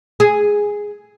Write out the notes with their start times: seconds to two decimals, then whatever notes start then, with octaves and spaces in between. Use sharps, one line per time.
0.20 G#4